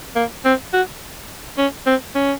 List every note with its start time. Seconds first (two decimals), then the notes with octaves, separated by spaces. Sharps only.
0.16 A#3
0.45 C4
0.73 F#4
1.58 C#4
1.86 C4
2.15 C#4